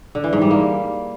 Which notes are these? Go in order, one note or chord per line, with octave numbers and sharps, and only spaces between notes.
D3
E3
G#2
G3
A#3